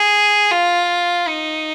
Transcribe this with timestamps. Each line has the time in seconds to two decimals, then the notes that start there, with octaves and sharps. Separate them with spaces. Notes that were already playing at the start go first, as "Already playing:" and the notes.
Already playing: G#4
0.51 F4
1.27 D#4